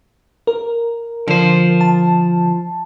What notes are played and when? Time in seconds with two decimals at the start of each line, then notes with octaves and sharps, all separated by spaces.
0.47 A#4
1.28 D3 F3 C5
1.81 A5